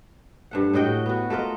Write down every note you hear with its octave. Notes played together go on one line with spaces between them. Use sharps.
G2 A3 F#5
A2 F#4 D#5 G5
B3 F#4
A3 F4 A#4 D#5